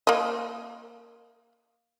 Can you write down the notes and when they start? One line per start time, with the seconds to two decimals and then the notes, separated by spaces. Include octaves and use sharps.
0.07 A#3 D#5